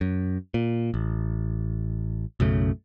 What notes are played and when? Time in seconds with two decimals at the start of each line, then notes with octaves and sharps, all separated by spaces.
0.01 F#2
0.54 A#2
0.94 A1
2.40 B1 F#2 C#3 A3